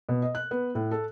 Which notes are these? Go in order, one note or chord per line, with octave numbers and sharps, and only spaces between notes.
B2
D#5
F#6
B3
A2
A4